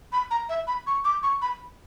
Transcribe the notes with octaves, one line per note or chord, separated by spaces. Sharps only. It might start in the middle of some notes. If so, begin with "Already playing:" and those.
B5
A#5
E5
B5
C#6
D6
C#6
B5